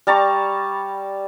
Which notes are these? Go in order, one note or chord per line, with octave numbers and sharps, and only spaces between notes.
G3 A5 A#5 C#6